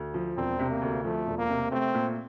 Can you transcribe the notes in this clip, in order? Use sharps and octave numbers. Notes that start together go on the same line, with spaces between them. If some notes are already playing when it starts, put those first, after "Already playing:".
Already playing: D2
F3
E1 C4
C3
A#3
D2
F3 A3
E1
A#3
C3
A3 C4
A#2